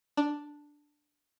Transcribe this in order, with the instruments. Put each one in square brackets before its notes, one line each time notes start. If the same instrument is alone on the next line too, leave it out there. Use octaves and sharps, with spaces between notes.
[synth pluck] D4